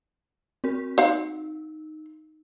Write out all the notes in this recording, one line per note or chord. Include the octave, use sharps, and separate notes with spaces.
C4 F#4 A#4
D#4 C5 F5 F#5